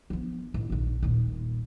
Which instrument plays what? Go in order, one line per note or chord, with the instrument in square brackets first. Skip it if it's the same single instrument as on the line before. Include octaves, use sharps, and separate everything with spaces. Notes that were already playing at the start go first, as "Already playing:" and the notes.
[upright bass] F3 B3
A1
A#1 D#2
D#1 A#2